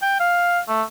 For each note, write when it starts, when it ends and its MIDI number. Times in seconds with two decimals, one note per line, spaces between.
0.02 0.17 79
0.20 0.60 77
0.68 0.83 57